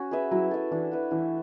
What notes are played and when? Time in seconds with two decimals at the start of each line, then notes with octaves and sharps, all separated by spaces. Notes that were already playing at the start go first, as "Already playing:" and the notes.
Already playing: C#4 F#4
0.11 G#4 B4 E5
0.31 F#3 E4
0.51 A4 E5
0.71 E3 D4
0.91 F#4 B4 E5
1.11 E3 A3